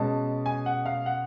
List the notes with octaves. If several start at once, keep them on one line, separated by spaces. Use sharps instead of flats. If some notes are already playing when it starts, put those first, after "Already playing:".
Already playing: B2 G#3 C#4 A5
G#5
F#5
F5
F#5